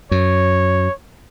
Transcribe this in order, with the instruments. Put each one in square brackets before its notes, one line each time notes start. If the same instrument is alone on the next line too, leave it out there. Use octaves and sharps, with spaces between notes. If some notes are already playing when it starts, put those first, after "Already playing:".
[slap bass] F#2 [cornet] C#5